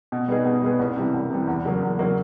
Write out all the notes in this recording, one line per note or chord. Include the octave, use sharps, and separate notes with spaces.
B2
G3 B3 D#4 G#4
B2
G3 B3 D#4 G#4
C2
C3 E3 G3
C2
C3 E3 G3
E2
C#3 F#3 A#3
E2
C#3 F#3 A#3